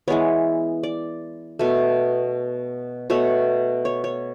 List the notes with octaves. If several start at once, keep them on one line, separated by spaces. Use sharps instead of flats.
E3 G#3 B3 C#5
D5
B2 A3
B2 A3 C#5
C#5
C#5